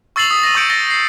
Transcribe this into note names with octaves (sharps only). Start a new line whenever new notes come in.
C#6 E6 A6 C7 F7 F#7
D#6 B6
A#6 D#7
C#6 D#6 G6 C#7 D7
A6 A#6 G7
A#6 C7